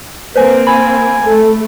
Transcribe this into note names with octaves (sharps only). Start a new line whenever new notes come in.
A#3 C4 B4 C5 G#5
G#5 B5
A3 A4